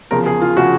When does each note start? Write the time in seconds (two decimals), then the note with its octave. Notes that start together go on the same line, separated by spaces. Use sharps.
0.11 E2 C#3 F3 A#4
0.26 G#4
0.42 F4
0.57 C#3 F3 F#4